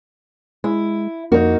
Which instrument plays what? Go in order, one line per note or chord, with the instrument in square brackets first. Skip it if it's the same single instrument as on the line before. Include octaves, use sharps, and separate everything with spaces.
[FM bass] G#3 [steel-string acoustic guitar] E4
[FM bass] F2 [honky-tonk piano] A#3 [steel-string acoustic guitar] D#4 F#4